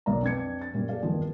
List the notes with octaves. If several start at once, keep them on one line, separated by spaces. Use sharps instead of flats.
E1 B1 A#3 D5 A#5
F2 D4 B4 G#6 C#7
A6
F#2 A#2 G3
A4 D5 F5
F1 E2 G2 D#3 F3 A#3